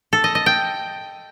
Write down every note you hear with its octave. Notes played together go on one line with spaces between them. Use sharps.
A4
D#5
D#5
G5